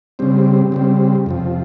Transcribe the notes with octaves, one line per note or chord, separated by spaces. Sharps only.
C#3 G3 C4
C#3 G3 C4
F2 C3 F3